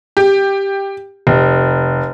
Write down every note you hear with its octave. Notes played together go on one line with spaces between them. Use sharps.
G4
F1